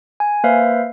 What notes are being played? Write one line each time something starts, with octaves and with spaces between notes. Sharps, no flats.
G#5
A#3 B4 C5 E5 F5